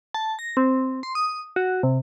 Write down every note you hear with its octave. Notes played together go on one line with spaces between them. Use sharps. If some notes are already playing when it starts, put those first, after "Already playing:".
A5
A#6
C4
C6
D#6
F#4
C3